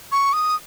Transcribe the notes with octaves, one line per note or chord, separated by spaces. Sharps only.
C#6
D#6